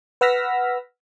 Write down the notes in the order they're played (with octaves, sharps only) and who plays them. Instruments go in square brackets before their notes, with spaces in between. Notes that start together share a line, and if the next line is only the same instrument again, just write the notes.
[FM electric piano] B4 F#5 E6 F6 A#6 B6